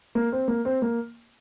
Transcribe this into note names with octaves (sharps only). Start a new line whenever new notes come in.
A#3
C4
A#3
C4
A#3